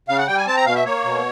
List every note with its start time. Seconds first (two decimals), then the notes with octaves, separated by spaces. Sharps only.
0.08 C#3 F5
0.18 F#5
0.27 G3 G5
0.37 G#5
0.47 C4 A5
0.57 A#5
0.66 B2 F5
0.75 E5
0.85 A#3 C#5
1.04 B2